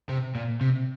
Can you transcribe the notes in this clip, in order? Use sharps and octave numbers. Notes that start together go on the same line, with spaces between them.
C3
A#2
C3